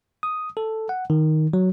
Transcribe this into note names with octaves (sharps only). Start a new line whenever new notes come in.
D#6
A4
F#5
D#3
F#3